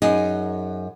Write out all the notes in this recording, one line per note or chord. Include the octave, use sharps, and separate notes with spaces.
F#2 D#4 G#4